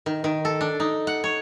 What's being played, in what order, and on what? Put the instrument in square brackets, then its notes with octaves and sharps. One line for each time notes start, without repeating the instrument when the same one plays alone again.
[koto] D#3
D#3
A4
D4
D#4
F#5
C#5